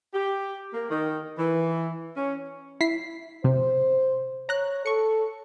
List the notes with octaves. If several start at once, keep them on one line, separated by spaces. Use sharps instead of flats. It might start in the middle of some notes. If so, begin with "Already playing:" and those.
G4
A#3
D#3
E3
C#4
E4 B6 C7
C3 C5
C#5 A#5 F#6
A4 C#6 C#7